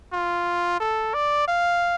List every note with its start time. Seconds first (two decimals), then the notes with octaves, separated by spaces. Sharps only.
0.12 F4
0.80 A4
1.14 D5
1.48 F5